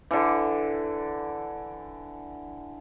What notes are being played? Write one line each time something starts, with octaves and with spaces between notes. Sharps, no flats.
D3 E3